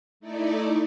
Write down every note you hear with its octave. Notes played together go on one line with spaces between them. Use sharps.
A3 D#4 E4 D5